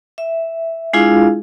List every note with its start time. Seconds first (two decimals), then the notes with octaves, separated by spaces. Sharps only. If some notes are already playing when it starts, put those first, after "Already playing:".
0.18 E5
0.93 G#3 D4 E4 F4 G#4 F5